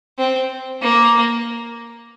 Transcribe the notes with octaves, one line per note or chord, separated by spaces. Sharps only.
C4
A#3